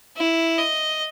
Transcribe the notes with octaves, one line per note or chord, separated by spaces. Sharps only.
E4
D#5